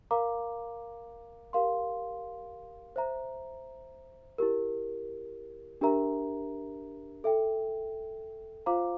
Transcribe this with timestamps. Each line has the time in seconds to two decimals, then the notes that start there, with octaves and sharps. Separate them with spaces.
0.11 A#4 F5 A#5 D6
1.53 G4 A#4 F5 C6
2.96 C5 E5 A#5
4.38 E4 G4 A#4
5.81 D4 G4 A#4 E5 A#5
7.24 A4 E5 G5
8.66 F4 C5 F5 A#5 D6